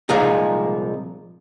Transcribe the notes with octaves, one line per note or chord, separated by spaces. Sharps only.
C2 A#2 F3 G#3 D#4 G#4